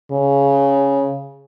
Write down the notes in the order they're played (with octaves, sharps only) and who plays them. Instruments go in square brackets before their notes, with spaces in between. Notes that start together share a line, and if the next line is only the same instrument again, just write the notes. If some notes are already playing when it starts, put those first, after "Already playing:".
[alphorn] C#3